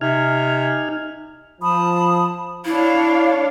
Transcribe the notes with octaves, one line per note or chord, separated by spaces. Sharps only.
C3 D#4 G#5 F6
F3 A5 B5 D#6
D4 E4 C#5 F5